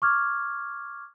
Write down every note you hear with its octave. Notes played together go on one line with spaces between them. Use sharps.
C#6 D6 F6 G#6